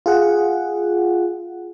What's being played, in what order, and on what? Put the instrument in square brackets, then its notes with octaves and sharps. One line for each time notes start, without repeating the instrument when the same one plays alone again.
[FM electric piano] F4 G#4 F#5